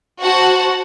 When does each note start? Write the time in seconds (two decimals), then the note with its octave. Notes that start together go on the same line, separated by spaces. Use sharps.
0.20 F#4 C5 F#5 A5